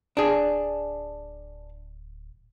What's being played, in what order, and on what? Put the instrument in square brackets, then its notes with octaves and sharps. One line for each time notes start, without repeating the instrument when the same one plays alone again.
[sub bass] D1 [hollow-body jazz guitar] D4 G#4